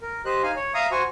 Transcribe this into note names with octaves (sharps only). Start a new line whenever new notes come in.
A#4
G4 C5 D#5 F#6
D#4 F5 G#5
C#5
E5 F5 A#5 D#6
F#4 C5 G#5 C#6